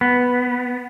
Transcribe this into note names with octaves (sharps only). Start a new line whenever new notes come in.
B3